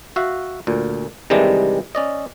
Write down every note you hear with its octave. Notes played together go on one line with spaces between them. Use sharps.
F#4 E5 F5
D2 A#2
C3 D#3 E3 G3 G#3 D4
C#4 D5 D#5